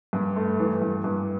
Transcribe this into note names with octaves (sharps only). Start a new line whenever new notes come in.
G2
A3
E3
G2
G2